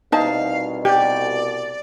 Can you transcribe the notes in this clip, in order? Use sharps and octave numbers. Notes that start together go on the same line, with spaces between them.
C2 B2 D#4 F5 A5
G4 D5